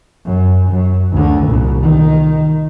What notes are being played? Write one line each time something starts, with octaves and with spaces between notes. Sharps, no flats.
F#2
F#2
D2 D3
C2 A#2
D#3